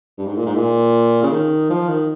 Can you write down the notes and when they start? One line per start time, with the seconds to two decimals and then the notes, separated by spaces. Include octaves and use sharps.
0.18 G2
0.27 G#2
0.37 A#2
0.46 G#2
0.56 A#2
1.23 C#3
1.31 D#3
1.70 F3
1.89 D#3